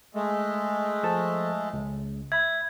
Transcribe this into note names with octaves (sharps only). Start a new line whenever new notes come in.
G#3 A3
F3 A4 A5
C#2
E5 B5 G#6